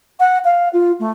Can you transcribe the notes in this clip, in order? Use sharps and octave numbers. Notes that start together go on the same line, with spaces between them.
F#5
F5
F4
A3